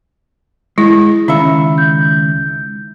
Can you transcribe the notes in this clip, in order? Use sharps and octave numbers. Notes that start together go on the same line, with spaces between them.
G#3 E4 A#6
C#2 D#3 C#4 E5 B5 E6 C#7
G6